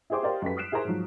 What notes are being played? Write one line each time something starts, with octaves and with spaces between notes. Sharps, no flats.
E4 G4 G#4 C5 D6
G4 A#4 C5 D5 D#5 F5
F#2 G4 A4 B4 B6
D#6 F6 F#6 C7 D7 E7
E4 G#4 A#4 C5 A#5
G#2 F3 F#3